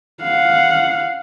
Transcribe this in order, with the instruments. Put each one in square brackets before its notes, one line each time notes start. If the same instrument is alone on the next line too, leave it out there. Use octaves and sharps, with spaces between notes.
[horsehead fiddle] F5 F#5